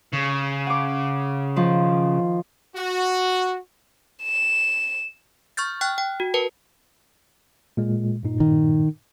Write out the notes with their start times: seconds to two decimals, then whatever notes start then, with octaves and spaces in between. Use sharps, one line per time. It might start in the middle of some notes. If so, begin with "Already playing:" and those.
0.13 C#3
0.67 F#5 D6
1.56 D#3 F3
2.75 F#4
4.23 E7
5.57 C#6 F6 G6 A6
5.81 G5 F6 F#6
5.98 G5
6.20 F#4
6.34 A#4 B4 A5
7.77 A#2 G#3
8.23 G2 A#2 D#4
8.40 D#3